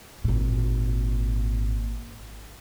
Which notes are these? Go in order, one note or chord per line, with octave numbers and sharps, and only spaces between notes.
G#1 A#2